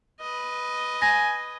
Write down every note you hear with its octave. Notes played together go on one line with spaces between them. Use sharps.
B4 D#5
G#5 A#6